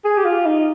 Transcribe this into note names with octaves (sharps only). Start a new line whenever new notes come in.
G#4
G4
F4
D#4